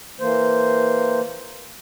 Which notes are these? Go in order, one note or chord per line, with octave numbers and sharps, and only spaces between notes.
E3 A#3 C5